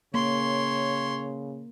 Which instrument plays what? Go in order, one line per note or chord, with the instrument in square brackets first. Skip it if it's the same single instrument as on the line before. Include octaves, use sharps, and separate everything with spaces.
[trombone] C#3 [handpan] A#3 [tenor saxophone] C#5 [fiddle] C6